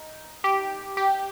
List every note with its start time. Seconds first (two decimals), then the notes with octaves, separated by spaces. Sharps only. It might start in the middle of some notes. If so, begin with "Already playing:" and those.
Already playing: D#4
0.44 G4
0.97 G4